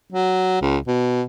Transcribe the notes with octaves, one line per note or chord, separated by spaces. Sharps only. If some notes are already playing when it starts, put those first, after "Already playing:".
F#3
C#2
B2